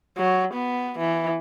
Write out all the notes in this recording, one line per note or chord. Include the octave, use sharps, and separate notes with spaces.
F#3
B3
E3